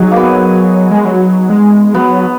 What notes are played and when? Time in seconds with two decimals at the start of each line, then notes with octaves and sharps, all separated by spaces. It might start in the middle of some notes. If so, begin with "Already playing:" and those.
Already playing: F#3 D#4 F#4 G#4
0.11 A#3 B3
0.91 G#3
1.05 F#3
1.49 G#3
1.94 F#3 B3